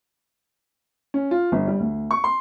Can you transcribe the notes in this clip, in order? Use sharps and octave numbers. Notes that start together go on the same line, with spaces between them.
C#4
F4
G1
G3
D2
C#6
C6